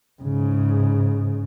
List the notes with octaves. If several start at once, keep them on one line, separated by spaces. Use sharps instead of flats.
G#2 C#3